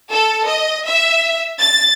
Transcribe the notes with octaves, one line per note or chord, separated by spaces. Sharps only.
A4
D#5
E5
A6